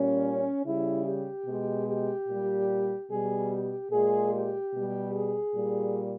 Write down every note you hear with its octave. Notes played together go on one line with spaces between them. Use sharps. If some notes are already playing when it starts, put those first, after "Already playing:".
Already playing: A#2 G3 C#4
C#3 G3 E4
G4
B2 G#3
G4
A#2 G3
B2 G3 G#4
G4
A#2 G#3 G#4
G4
B2 G3
G#4
A#2 G3